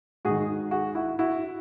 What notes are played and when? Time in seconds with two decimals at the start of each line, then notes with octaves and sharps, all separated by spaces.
0.25 G#2 D#3 F#4 G#4
0.71 F#4 G#4
0.95 E4 F#4
1.19 E4 F#4